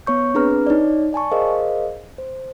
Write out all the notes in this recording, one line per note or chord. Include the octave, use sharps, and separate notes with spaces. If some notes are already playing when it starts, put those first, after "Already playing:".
B3 C#5 C#6 G6
C4 D4 G#4 B4 A#5 F6
D#4 C#5 D5
D5 G#5 A5 C#6
G#4 A#4 C5 D#5 F5
C5